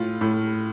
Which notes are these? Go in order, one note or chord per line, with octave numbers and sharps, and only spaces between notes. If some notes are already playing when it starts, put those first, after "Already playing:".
Already playing: A2 F4
A2